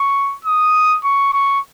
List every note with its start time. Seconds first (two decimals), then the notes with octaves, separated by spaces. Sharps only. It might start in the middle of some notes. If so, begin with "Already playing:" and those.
Already playing: C#6
0.45 D#6
1.04 C#6
1.33 C#6